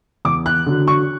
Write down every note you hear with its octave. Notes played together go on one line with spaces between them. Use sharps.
E2 D6
F#6
D3 F#3
C#6